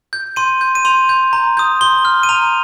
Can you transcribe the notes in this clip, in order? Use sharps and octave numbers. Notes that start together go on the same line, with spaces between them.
G6
C6 D#7
G6
D#7
C6 F7
G6
A#5
D#6 G6
C6 G7
F6
D#7
A#5 F7